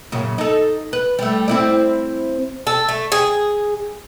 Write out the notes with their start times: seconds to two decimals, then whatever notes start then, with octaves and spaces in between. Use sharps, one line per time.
0.12 F#2 A#2 C#3
0.38 D#4 A4
0.93 B4
1.19 G3 A3
1.48 C4 E4 D5
2.67 A4
2.89 A3
3.12 G#4